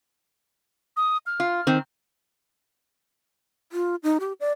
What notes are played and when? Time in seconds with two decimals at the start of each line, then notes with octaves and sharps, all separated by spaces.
0.97 D#6
1.26 F6
1.40 F4
1.67 D#3 C4
3.72 F4
4.03 D#4
4.20 G4
4.40 D5